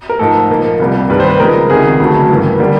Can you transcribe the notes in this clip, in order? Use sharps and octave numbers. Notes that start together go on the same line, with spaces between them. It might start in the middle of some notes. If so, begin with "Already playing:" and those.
A#4
G#2 F3 A3 A4
A#2 F3 A#3
C2 A#2 G3 A#3
G2 D#3 G3 B4
C5
B4
C#2 C#3 F3 G#3 A#4
C2 C3 D#3 G#4
D2 C#3 F#3 A3
G2 E3 G3 A#3
D3 G3 A#3